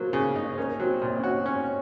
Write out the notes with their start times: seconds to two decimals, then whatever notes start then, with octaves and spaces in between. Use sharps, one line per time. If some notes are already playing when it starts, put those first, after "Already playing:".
Already playing: F#3 A#3 A#4 C5
0.13 C#3
0.36 D#4
0.53 C5
0.58 A#3 C#4 A#4
0.80 F#3 C4 C5
1.02 A#2 C#5
1.10 D#5
1.19 C#4 F#4 C#5
1.46 C#4